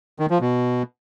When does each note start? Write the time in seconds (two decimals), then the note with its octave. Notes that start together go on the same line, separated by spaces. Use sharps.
0.19 D#3
0.30 F3
0.41 B2